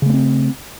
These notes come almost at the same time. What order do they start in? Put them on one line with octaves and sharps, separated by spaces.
C#3 A3 B3 C4